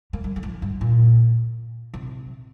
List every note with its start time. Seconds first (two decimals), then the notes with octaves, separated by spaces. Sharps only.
0.13 A#3
0.24 G3
0.36 D3
0.43 F3
0.62 G2
0.81 A#2
1.94 C3